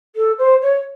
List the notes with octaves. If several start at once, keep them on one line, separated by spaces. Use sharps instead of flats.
A4
C5
C#5